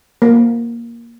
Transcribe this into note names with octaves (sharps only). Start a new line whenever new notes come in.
A#3